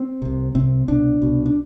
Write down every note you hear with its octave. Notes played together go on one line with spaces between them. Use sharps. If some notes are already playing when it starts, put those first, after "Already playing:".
Already playing: C4
C2 C3
C2 C3 C4
C2 B2 D4
C2 B2
D4